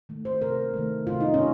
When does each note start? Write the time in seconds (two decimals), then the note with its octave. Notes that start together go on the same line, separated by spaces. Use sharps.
0.09 D#3 A3
0.25 C5
0.42 C3 A#4
0.74 D#3 A3
1.07 C3 F4
1.20 D#4
1.34 C#4